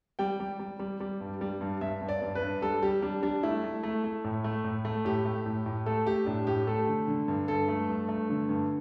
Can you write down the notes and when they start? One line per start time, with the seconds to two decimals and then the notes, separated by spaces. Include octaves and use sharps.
0.19 G3 G5
0.40 G3
0.60 G3
0.79 G3
1.00 G3
1.20 G2
1.41 G3
1.61 G2
1.81 G2 E5
2.01 G2
2.09 D5
2.22 G2
2.35 B4
2.41 G2
2.62 G3 A4
2.82 G3 G4
3.02 G3 D4
3.23 G3 D4
3.43 A3 E4
3.64 A3
3.83 A3
4.04 A3
4.24 A2
4.44 A3
4.64 A2
4.85 A3
5.05 A2 G4
5.25 A3
5.46 A2
5.66 A2
5.86 A3 A4
6.06 A3 G4
6.26 A2 D4
6.47 A2 G4
6.67 A3 A4
6.87 D3
7.08 D3
7.28 G2
7.48 G2 A4
7.68 A3
7.89 G2
8.09 A3
8.29 D3
8.49 G2